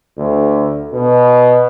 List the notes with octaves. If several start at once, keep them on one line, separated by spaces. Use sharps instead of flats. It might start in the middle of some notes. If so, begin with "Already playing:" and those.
D2
B2